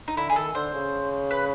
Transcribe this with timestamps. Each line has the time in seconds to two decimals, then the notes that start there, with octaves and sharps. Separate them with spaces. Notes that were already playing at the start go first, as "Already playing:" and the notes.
0.08 D#4
0.16 D3 E4
0.30 D3 G#4
0.36 D#3 A4
0.55 D3 C5
0.74 C#3
1.31 B4